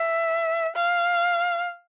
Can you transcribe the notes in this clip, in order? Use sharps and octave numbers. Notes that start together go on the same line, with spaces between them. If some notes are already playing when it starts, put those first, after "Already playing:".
Already playing: E5
F5